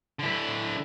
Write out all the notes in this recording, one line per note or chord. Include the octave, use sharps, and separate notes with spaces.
D3 E4